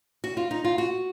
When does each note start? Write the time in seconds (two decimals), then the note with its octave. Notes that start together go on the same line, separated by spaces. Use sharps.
0.24 F#4
0.37 F4
0.51 D#4
0.64 F4
0.78 F#4